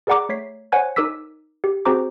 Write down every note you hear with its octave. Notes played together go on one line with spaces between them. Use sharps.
G#4 A#4 D5 F#5 A#5 D6
A3 C#5 B6 C7
C5 C#5 F#5 G#5 F#6 G#6
D#4 A#4 D6 E6 B6
G4
C4 F#4 G#4 C5 A#5 D6